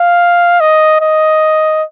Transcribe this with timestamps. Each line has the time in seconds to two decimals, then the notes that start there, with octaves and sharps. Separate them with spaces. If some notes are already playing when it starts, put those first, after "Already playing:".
Already playing: F5
0.60 D#5
1.00 D#5